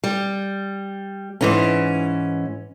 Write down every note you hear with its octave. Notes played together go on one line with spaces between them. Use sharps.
G3
G#2 E3 C#4